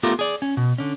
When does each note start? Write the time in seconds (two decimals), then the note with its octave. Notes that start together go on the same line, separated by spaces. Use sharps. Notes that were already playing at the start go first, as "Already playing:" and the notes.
0.03 A3 B3 F4 G4 A4 A#4
0.19 G#4 D5
0.42 C#4
0.57 B2
0.78 D3 C#4